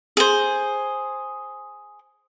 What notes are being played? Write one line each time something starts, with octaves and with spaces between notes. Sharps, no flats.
G#4 C5